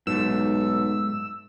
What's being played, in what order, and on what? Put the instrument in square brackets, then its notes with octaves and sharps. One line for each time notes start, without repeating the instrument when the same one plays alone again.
[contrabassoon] B1 [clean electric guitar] G#2 A3 [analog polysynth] E6